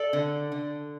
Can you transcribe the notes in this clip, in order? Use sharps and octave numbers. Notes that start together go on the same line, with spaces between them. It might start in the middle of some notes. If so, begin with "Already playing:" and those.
Already playing: A4 D5
D3
D3